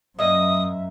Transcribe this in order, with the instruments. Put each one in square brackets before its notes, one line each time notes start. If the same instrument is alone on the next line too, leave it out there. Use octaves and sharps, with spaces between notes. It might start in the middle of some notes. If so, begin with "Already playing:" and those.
[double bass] F#2 [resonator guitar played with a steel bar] A#3 D#5 [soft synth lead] E5 [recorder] D#6